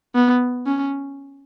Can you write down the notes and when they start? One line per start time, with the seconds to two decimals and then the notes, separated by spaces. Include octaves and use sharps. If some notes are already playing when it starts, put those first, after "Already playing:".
0.15 B3
0.66 C#4